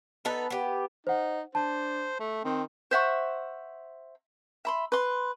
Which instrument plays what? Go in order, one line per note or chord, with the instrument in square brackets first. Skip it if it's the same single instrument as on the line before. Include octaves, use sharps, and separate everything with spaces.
[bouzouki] B3 D#4 A4 B4
B3 G4
[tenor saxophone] D#4 [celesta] C5 F#5
[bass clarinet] D4 [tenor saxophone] C5 [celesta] A5
[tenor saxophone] A3
[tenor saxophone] D#3 [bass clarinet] C4
[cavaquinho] C5 E5 F#5 C#6
E5 B5 C6
B4 C6